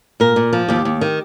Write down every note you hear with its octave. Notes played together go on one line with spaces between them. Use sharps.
A#2 A#4
A#2
F3
D#2 G4
D#2
D#3